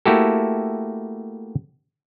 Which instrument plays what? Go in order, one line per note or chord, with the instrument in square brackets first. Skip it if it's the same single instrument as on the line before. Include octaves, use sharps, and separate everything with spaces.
[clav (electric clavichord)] A3 A#3 E4 F#4 G4 A4